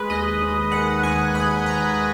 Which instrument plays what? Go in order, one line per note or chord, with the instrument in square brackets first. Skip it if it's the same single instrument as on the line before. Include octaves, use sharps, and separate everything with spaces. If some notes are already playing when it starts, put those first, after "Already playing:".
Already playing: [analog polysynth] G#3 B4
D#2 D#5
D#2
D#3 F#5
D#2 G#5
D#2 B5
D#2 A#5